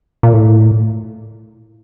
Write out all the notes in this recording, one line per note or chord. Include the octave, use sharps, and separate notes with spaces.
A#2
A2